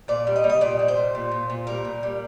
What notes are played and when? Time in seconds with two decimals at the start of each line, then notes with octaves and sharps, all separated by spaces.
0.08 A#2 D5
0.27 G3
0.36 D#5
0.44 G3
0.49 D#5
0.61 A#2 D5
0.79 G3
0.88 C5
0.97 A#2
1.15 A#2
1.32 A#2
1.50 A#2
1.67 G3 A#4
1.85 A#2
2.03 G3